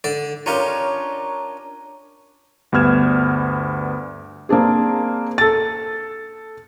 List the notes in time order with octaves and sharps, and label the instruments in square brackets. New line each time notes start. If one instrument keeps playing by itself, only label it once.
[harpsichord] D3 D5
[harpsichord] C#4 F4 G4 [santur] D4 A#4 C#5
[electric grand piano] D2 G2 B3 F6 G#6 E7
[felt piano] A#3 C4 D4 G#4
A4 A6